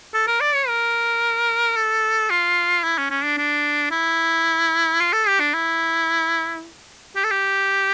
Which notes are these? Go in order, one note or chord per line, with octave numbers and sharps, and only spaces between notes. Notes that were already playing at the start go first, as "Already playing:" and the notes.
A4
A#4
D5
C#5
A#4
A4
F4
E4
C#4
C#4
D4
D4
E4
F4
A4
G4
D4
E4
G4
A4
G4